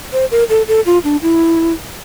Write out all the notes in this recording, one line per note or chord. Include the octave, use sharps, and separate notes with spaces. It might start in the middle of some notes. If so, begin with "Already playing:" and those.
C5
A#4
A4
A4
F4
D4
E4